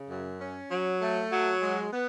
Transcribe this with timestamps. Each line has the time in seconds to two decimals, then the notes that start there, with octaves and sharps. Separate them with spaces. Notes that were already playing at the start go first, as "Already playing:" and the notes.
Already playing: C#3
0.08 F#2
0.40 C#4
0.71 F#3
1.01 A3
1.32 F#3
1.62 G#3
1.93 B3